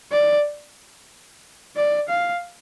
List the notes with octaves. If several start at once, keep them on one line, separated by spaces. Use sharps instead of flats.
D5
D5
F5